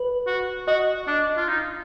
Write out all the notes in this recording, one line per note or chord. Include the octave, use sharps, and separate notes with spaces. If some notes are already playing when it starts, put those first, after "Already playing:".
Already playing: B4
F#4
F#4 D#5
D4
F4
D#4